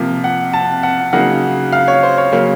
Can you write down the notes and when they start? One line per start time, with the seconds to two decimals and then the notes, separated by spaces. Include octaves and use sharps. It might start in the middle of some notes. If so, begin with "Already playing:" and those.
Already playing: C3 F3 A#3
0.24 F#5
0.53 A5
0.83 F#5
1.13 C#3 F#3 A#3 D#4 F#5
1.72 F5
1.88 C#5
2.03 C5
2.18 C#5
2.32 C#3 F#3 A#3 C#5